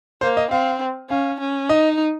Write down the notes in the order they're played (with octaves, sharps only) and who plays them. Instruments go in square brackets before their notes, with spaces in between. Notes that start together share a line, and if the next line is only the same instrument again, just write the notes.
[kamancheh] A#3 [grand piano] C5
[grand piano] D#5
[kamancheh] C4 [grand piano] F5
[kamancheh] C#4 [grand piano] F5
[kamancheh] C#4
[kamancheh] D#4 [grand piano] D#5